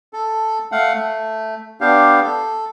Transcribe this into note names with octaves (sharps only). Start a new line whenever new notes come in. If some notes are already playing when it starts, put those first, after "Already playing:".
A4
A3 F5 F#5
A3
B3 D4 G4 F5
A4